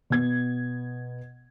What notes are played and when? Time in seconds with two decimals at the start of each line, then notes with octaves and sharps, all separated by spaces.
0.10 B2 B3 G#6